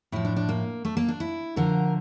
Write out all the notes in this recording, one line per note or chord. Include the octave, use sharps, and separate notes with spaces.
A2 F3 E4
D4
D4
A#3
A3
A#3
D4
E4
D2 D3 F3 A#4